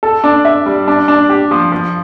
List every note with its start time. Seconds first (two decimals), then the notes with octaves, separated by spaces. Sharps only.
0.03 A4
0.24 D4
0.45 E5
0.66 G3
0.88 D4
1.08 D4
1.30 G4
1.51 F3
1.72 F3